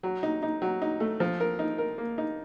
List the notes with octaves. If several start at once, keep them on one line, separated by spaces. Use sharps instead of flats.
F#3
D#4
D#4
F#3
D#4
A3
F3
A#4
D#4
A#4
A#3
D#4